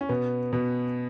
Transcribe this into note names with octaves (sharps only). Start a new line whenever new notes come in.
C#4
B2 B3
B2 B3